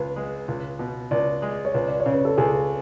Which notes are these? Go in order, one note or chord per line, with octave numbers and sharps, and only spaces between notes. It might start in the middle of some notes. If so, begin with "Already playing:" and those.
Already playing: C#2 B4
G#3
C#2
B2
C#2 D5
G#3
C#5
C#2 B4
D5
C#5
C#3
B4
A4
C#2 G#4